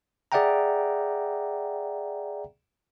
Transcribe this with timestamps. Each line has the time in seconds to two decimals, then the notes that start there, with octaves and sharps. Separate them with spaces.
0.32 G#4 D5 E5 F#5 G5 A#5